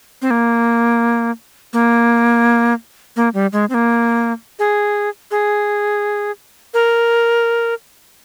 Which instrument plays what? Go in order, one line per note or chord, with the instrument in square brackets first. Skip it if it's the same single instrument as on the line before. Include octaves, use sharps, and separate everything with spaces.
[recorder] C4
A#3
A#3
A#3
G3
G#3
C4
A#3
G#4
G#4
A#4